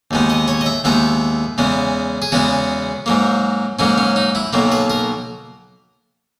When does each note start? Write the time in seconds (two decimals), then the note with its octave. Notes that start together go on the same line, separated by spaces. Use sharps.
0.11 D#2 D#3 G#3 B3
0.30 D#5
0.48 C#5
0.61 D#5
0.66 E5
0.84 D#2 D#3 G#3 B3 E5
1.58 E2 C#3 G#3 B3
2.22 G#4
2.32 E2 C#3 G#3 B3 F#4
3.06 G#2 F#3 A#3
3.79 G#2 F#3 A#3 C#4
3.98 C#4
4.16 D#4
4.35 E4
4.53 B1 B2 F#3 A#3
4.72 B4
4.90 A#4